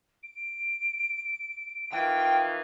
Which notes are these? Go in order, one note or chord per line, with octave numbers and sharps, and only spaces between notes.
D7
D#3 E3 F4 G5